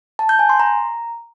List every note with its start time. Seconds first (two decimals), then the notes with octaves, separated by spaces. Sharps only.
0.19 A5
0.29 G6
0.39 G#5
0.49 C6
0.60 A#5